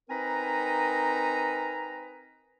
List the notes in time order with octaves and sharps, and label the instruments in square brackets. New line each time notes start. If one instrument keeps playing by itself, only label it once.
[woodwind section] C4 D#4 A#4 B4 G#5 A#5